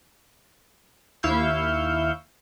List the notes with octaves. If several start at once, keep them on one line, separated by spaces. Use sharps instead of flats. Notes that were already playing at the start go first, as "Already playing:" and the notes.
D#2 E4 F5 C#6 E6 G6